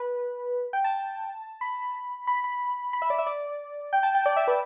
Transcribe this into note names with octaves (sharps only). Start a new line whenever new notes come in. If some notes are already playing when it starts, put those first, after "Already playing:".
Already playing: B4
G5
A5
B5
B5
B5
B5
E5
D5
E5
D5
G5
A5
G5
D5
E5
B4